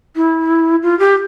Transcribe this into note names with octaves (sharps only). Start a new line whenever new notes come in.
E4
F4
G4